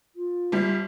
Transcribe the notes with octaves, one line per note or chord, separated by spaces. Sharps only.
F4
G1 G3